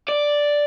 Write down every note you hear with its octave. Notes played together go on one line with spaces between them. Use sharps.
D5